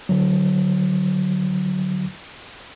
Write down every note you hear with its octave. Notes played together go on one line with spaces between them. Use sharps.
D3 F#3